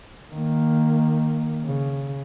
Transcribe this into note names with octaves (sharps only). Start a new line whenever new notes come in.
D#3 A#3
C#3